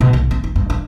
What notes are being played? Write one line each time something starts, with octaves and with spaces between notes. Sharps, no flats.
B2
B1
C4
D#4
G2
D4